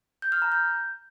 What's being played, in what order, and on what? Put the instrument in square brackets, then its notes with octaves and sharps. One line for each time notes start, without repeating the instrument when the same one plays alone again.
[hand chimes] G6
F6
A#5
G6